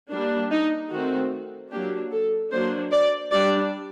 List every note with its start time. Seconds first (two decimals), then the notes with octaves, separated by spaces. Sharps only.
0.11 G3 A#3 D4
0.51 D#4
0.91 D#3 A3 C4 F#4
1.71 F#3 A#3 D4 G4
2.12 A4
2.52 F#3 A#3 D4 C5
2.92 D5
3.31 G3 D4 D5